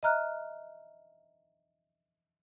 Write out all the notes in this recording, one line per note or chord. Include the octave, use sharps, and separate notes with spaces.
D#5 E5 A#5 F6 F#6